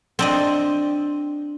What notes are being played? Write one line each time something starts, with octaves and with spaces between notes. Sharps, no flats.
C4 D4 D#5